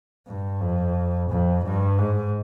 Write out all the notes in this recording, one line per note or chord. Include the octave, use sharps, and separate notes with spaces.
G2
F2
F2
G2
G#2